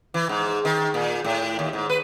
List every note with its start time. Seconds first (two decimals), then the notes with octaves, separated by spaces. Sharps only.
0.14 E3
0.29 G#2
0.65 D#3
0.94 A#2
1.24 A2
1.59 D#2
1.73 G#2
1.90 B4